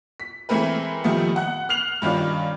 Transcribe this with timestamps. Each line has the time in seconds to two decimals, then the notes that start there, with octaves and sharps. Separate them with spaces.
0.20 B6
0.49 E3 G#3 A3 C4 A#4 B4
1.04 A#2 D#3 F3 G3 A3 B3
1.36 F#5 F#6
1.69 F6 F#6 C7 F7 F#7
2.02 G2 D#3 C#4 F4 D5